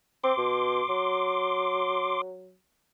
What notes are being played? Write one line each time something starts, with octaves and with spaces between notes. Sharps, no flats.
C4 C6 D6
B2
F#3